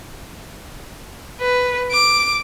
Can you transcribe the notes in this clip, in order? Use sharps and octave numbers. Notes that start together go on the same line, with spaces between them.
B4
D6